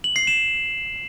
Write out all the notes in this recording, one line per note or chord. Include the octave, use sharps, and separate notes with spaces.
F#7
C7
E7